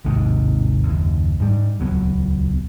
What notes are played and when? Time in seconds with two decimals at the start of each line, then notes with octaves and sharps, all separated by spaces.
0.05 A1 D#2 G#2 C3
0.84 F#1 D#2
1.40 G#2 G3
1.79 D#1 C#2 F#3 B3